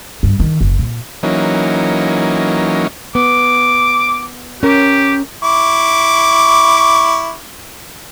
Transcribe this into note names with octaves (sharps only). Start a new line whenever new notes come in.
G2
D#3
F#1
A#2
E3 F#3 A#3 C#4 D#4
B3 D6
C#4 G4 A#4
E4 C#6 D6